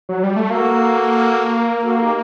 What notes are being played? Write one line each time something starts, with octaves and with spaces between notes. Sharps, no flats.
F#3
G3
A3
A#3 F#4 A4
A#4
F#4 A4
A4
D#4 G4